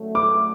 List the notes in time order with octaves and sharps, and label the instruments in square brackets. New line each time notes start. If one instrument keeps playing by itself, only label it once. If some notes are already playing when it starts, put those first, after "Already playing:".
Already playing: [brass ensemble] F#1 F#2 D3 F#3 A3
[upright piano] D6